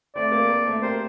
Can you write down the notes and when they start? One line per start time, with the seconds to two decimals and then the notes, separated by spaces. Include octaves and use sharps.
0.15 A3 C4 D5
0.32 A#3
0.49 A#3
0.65 A3 C4
0.82 G4 A#4 C5